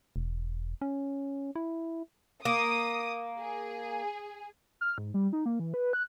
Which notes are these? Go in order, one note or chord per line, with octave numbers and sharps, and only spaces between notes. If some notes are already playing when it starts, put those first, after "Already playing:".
E1
C#4
E4
A#3 D#6
G#4
F6
G#2
G3
D#4
A#3
E3
B4
F#6